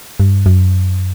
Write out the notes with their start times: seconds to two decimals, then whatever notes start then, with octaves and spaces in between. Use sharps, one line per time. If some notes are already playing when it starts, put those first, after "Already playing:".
0.20 G2
0.46 F#2